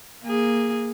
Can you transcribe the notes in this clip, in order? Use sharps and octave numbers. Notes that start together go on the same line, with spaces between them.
A#3 G#4